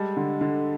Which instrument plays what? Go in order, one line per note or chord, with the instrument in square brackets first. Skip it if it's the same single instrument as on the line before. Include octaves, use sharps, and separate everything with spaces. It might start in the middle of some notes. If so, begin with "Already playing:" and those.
Already playing: [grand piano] G3 G#3 A4
D3
D3